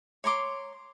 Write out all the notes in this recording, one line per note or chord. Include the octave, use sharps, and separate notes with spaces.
C#5 A#5 C6 D6